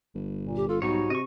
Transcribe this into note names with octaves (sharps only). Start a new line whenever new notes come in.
G1
A#2
G4
F4 A4
B1 G#2 G3 D#4 F#4 C#5
C3 D#5 C#6